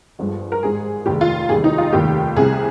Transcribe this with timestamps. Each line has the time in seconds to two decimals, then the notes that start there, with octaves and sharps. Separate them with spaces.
0.19 G1 G2 F3 G#3
0.52 A#4
0.62 G#1 G#2 G3 G#4
1.06 F1 D#2 D#3 G#3 G4
1.21 F4
1.49 F1 D#2 D#3 G3 G#4
1.64 D#4
1.78 F4
1.93 F1 D#2 D#3 G3 G4
2.36 C2 C3 G3 G#4